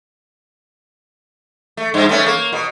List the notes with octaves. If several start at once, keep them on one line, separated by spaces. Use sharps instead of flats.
A3
G2
A3 B3 C#4
A#3
B2